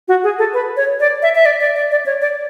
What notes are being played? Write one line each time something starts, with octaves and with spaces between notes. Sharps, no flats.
F#4
G#4
A4
B4
C#5
D5
E5
E5
D5
D5
D5
D5
C#5
D5